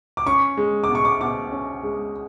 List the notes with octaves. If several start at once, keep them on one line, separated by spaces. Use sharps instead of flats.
D6
C#4 C#6
G#3
B2 D6
C#6
D6
B2 D6
C#4
G#3